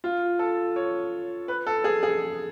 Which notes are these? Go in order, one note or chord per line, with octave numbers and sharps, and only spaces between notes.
F4
A4
C#5
B4
A4
G#4
G#4